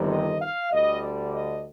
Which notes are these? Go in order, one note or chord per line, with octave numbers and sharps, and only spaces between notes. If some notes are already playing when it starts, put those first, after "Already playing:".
Already playing: G1 F2 C3 D#3 G3
D#5
F5
D2 D3 G3 D#5
D5
D#5